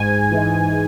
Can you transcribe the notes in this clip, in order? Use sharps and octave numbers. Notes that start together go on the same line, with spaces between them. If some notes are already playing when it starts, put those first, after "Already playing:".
Already playing: G#2 G#5
E3 G#3